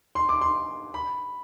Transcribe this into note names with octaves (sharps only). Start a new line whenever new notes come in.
C6
D6
C6
B5